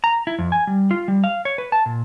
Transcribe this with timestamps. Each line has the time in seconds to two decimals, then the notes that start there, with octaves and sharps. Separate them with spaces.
0.04 A#5
0.27 E4
0.39 F2
0.52 G#5
0.67 G3
0.91 F4
1.08 G3
1.24 F5
1.45 C#5
1.58 B4
1.72 A5
1.86 A#2